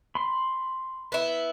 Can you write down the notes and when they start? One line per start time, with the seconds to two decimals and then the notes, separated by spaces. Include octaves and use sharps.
0.15 B5 C6
1.12 B3 E4